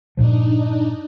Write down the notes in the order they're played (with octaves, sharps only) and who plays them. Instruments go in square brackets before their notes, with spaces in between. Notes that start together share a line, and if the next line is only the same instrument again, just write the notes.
[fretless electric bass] G2 A#2 F3 [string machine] D4 D#4